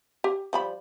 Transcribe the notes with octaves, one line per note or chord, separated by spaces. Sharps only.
G4
F3 G3 B5